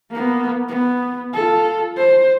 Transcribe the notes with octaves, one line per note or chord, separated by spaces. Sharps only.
A#3 B3
B3
F4 A4
C5